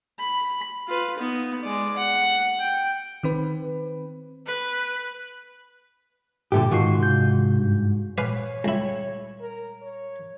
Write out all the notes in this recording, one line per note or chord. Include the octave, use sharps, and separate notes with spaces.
B5
F4 B4
B3 D#4
G#3 D5
F#5
G5
D#3 C4 B4
B4
G2 A#2 D3 A3 G4
G#2 D#3 F4 F#4 C#6 C7
C3 G6
G2
A#2 B4 C#5 F5 G#5
C#2 G3 E4
A#4
C#5